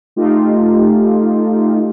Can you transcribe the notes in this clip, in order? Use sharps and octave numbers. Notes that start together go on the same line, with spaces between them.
A3 D#4 F4 G4